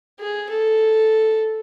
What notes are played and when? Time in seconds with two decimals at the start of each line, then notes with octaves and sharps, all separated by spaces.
0.20 G#4
0.49 A4